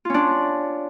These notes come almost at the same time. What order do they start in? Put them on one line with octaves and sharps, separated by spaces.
F4 C#4 D4